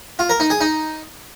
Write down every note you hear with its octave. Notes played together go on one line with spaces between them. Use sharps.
F4
A#4
D#4
G#4
D#4